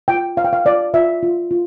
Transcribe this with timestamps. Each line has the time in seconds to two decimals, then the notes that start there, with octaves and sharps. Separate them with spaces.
0.08 F4 G5
0.37 C5 F5
0.44 G5
0.53 F5
0.65 F4 D5
0.94 F4 E5
1.23 F4
1.51 F4